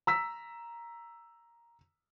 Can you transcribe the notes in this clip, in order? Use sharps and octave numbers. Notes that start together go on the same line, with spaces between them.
A#5 E6 B6